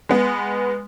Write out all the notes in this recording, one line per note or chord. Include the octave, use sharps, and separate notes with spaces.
G#3 B3